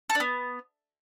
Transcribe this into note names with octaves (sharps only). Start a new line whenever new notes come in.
A4
D4
B3